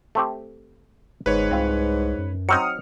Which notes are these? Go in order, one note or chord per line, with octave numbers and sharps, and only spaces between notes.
A3 C4 G4
G1 G#2 B4 C#5
C2 C4 F4
F#2
F#3 C4 D#4 D#6 F6 C#7